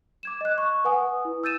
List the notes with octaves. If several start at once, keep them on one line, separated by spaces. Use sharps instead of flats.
D6 G#6 E7
D#5 F#6
C#6
B4 F#5 G#5 D#6
E4
E6 G6 A6 D#7 E7